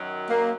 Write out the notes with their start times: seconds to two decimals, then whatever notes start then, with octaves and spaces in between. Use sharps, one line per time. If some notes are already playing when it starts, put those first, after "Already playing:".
Already playing: F#2 D#3 F#3
0.30 A#3